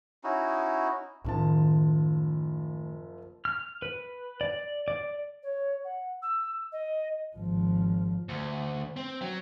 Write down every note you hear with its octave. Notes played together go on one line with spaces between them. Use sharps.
C#4 D#4 E4 F#4
F#1 A2 D#3 F3 A5
F6
B4
D5
D5
C#5
F#5
E6
D#5
G#1 F3
D2
C4
F#3